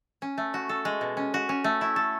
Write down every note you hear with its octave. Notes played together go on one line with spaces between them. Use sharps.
C#4
A3
F#4
A4
G#3
B2
C#4
F#4
C#4
A3
E4
A4